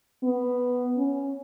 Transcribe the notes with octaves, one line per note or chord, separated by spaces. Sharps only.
B3
C#4